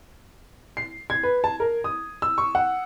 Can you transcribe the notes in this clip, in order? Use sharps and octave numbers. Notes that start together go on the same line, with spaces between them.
C7
G#6
B4
A5
A#4
D#6
E6
C#6
F#5